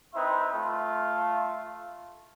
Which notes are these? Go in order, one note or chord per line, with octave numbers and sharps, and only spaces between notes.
C4 D#4 E4 B4 E5 C6
A3 F4